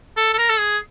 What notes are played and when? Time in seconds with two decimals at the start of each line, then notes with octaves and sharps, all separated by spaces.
0.17 A4
0.33 A4
0.38 A#4
0.50 A4
0.59 G#4